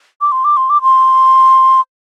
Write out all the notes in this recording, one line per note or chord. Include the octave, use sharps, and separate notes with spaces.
D6
C6
D6
C6
D6
C6